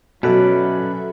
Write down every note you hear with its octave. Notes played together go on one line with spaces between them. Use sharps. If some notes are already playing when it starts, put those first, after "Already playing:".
B2 F#3 C#4 F#4 A4 B4 D5 E5